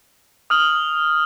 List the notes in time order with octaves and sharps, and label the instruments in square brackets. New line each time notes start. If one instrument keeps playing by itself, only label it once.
[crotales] D#6 F6 F#7